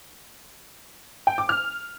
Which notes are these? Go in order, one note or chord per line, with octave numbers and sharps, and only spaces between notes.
G5
D6
F6